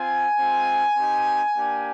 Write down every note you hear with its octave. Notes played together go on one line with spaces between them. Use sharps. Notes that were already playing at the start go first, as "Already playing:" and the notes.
Already playing: C4 F4 G#5
G#3 C4 F4
C4 D#4 G4
A#3 D4 G4